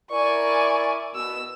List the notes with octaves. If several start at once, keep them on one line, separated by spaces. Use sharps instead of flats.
E4 A#4 D5 G#5 C#6
B2 E6